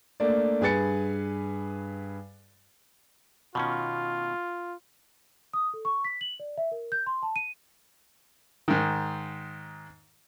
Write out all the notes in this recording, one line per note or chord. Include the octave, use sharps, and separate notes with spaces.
A3 A#3 D4 D5
G2 G#4 B4 G#5 A6 C#7
B2 D#3 C#4 F4
D#6
A4
C#6
B6
F#7
D5
E5
A#4
G6
C6
A5
D#7
G#2 D#3